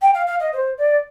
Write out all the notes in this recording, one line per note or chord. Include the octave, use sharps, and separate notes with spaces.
G5
F5
F5
D#5
C5
D5